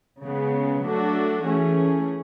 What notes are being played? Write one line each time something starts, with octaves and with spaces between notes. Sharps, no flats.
C#3 G#3 B3
F#3 A3 D4 F#4 A4
E3 A3 C#4 G#4